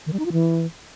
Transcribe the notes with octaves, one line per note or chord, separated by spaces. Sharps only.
D#3
G3
D#4
F4
E3